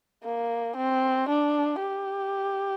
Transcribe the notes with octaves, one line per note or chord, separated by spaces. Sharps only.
A#3
C4
D4
G4